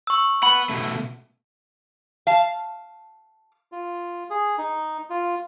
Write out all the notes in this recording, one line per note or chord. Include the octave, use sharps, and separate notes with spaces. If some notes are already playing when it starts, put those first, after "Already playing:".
C#6 E6
B4 F#5 B5
B2 A3
F5 A5
F4
G#4
D#4
F4